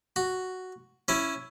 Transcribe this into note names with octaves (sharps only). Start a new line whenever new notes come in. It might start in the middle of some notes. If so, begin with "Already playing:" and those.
F#4
C#4 E4